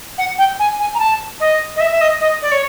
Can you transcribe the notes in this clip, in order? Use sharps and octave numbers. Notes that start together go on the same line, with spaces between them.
F#5
G5
G#5
G#5
A#5
A5
D#5
D#5
E5
E5
D#5
D#5
D5
C#5